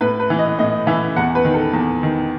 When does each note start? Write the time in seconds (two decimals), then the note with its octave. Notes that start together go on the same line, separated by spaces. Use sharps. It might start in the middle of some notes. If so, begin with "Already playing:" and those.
0.01 A2 B4
0.20 B4
0.30 E3
0.39 D#5
0.59 A2 D#5
0.87 E3 E5
1.16 E2 F#5
1.35 B4
1.45 D#3
1.54 A4
1.73 E2
2.03 D#3